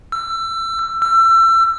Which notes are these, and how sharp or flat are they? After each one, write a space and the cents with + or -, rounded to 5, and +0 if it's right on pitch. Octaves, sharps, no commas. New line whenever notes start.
E6 +25
E6 +30